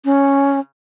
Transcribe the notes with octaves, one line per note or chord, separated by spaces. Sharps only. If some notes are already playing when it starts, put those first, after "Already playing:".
C#4